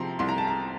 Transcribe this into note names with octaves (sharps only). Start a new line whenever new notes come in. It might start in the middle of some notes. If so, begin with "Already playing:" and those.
Already playing: C3 F3 C4 A#5 C6
C2 C6
A#5
A5
A#5